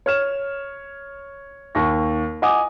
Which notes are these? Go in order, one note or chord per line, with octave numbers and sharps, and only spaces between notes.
C#5 F6 E7
D#2 C#6 A#6
D#5 F#5 G#5 D6 D#6